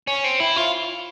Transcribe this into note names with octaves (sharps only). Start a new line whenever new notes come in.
C#4
C4
E4
F4